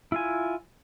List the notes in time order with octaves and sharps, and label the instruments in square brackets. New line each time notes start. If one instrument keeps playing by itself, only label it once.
[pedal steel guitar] E4 F4 G#5